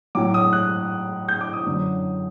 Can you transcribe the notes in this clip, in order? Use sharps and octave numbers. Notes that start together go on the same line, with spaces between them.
A2 F#3 D6
D#6
F#6
G6
D6
D#6
F#2 D3 F#3